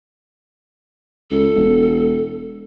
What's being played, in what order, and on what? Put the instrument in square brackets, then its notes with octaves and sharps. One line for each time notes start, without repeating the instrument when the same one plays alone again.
[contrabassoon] C#2 [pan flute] A4
[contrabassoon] E1